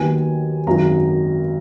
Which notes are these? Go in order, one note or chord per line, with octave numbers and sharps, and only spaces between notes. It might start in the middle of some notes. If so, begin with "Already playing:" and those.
Already playing: D#2 D#3 F#3 B3 G#5
G#1 F#2 D#3 F#3 A#5